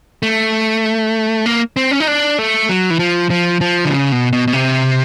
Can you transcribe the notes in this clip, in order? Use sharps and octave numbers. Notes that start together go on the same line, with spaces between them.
A3
A#3
C4
C#4
D#4
D4
A3
F#3
E3
F3
F3
F3
D3
C#3
B2
B2
B2
C3